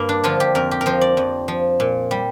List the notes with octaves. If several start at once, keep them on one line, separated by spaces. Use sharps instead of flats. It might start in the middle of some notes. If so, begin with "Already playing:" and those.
Already playing: G2 A#3
D4
D3 F3 F4
G4
F2 A#4
G4
A#4
F3 C5
D5
F2
F3
A#2
G3